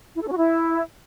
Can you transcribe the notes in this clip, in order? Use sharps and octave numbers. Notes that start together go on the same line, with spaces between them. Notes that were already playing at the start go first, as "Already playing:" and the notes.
E4
A4
C#4
F#4
E4